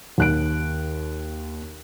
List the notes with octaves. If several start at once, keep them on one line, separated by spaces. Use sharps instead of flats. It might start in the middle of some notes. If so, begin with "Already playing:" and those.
D#2 F#6 D7